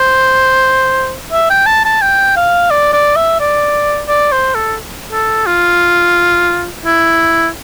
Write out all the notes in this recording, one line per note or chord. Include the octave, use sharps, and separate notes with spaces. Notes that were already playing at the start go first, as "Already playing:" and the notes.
Already playing: C5
E5
G5
A5
A5
G5
F5
D5
D5
E5
D5
D5
C5
A4
A4
F4
E4